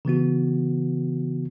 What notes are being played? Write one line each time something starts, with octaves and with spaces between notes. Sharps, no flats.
C#3 E3 B3 F#4